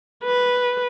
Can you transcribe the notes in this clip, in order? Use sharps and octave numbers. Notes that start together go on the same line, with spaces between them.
B4